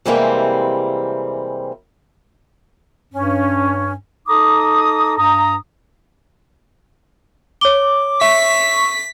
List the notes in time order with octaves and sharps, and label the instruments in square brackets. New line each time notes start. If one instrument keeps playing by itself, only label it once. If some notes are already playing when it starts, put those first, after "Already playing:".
[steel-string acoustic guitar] C3 E3 G3 G#3 A#3 C4
[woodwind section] G2 C#4
D#4 A4 A#5 D6 D#6
G2 A#5 D#6
[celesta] C#5 G7 [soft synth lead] D6
[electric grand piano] E5 [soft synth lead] C#6 [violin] B6